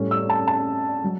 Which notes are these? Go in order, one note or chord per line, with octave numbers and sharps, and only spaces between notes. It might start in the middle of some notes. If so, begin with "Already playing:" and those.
Already playing: A2 G3 C#4
E6
A5
A5
F#3